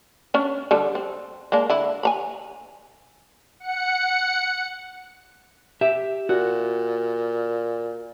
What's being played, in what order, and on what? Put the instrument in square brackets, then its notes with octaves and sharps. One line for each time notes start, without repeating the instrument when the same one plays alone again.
[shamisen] C#4 D4
D3 G3 A4
C4
G#3 A#3 D4
D3 E4
G#5 A#5 B5
[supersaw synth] F#5 C#7
[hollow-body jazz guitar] G4 E5
[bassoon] A#2 [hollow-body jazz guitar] F#4